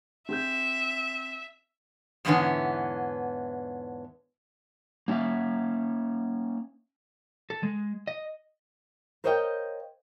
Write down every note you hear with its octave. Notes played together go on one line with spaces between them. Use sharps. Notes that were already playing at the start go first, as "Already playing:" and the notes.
C4 G#4 E5 G6
E2 G#2 D3 E3 B3 C#4
A#3 C#4 F4 E5 F5
A4
G#3
D#5
A#4 C5 C#5 D#5 F5 G5